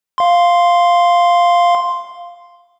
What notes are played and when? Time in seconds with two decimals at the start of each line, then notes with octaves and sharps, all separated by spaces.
0.18 F5 C6